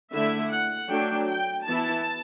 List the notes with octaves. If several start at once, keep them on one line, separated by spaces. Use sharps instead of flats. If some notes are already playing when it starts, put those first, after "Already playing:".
D3 A3 E4 E5
F#5
F#3 A3 D4 G5
G5
E3 B3 E4 A5